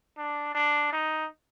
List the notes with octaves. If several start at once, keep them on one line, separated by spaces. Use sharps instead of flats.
D4
D4
D#4